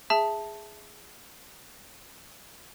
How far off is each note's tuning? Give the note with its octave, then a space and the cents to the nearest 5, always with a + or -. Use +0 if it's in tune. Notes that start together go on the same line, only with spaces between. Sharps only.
G#4 +0 E5 +0 A5 +0